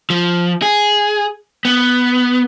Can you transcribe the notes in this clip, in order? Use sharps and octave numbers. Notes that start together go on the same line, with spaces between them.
F3
G#4
B3